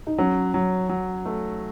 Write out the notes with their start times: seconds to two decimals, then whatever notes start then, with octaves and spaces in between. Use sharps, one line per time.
0.07 D#4
0.18 F#3 C#4
0.54 F#3
0.89 F#3
1.26 A3